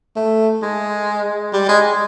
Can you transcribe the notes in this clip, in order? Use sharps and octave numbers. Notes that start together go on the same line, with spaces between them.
A3
G#3
G3
G#3